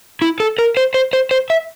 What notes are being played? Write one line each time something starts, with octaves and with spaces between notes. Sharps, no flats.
E4
A4
A#4
C5
C5
C5
C5
E5